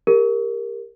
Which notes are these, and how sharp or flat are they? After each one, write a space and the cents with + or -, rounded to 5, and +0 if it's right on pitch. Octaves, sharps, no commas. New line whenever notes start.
G4 +30 A#4 +0